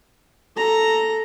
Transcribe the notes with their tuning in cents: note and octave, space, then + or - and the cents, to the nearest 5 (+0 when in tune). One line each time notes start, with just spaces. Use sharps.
A4 +0 A#5 +0